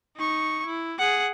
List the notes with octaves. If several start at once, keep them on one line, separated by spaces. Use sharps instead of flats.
D#4 C#6
E4
G#4 F#5